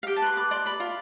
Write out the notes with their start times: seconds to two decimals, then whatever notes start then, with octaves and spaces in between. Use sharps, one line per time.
0.03 F5
0.07 G4 G5
0.16 A5
0.22 B4 C6
0.37 B4 D6
0.51 D5 C6
0.66 D5 B5
0.80 F4